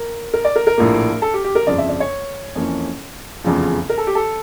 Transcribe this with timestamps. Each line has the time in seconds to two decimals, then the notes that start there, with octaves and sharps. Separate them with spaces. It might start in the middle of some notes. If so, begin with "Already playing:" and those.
Already playing: A#4
0.34 A#4
0.45 D5
0.56 A#4
0.67 A#4
0.78 A#1 A2 F3 A#3
1.22 A4
1.34 G4
1.44 G4
1.55 A#4
1.67 G1 F2 C#3 D5
1.78 E5
1.89 D5
2.00 C#5
2.55 F2 E3 A#3 C#4
3.44 F1 E2 C#3 F3
3.90 A#4
3.98 A4
4.07 G4
4.15 A4